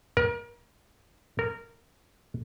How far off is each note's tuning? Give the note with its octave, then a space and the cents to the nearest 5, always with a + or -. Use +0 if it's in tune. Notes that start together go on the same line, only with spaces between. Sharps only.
A#4 +35
A#4 -15